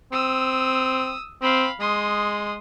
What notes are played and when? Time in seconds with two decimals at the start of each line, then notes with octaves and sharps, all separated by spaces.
0.12 C4 D#6 E6
1.42 C4 F5 B5
1.80 G#3 C6 D#6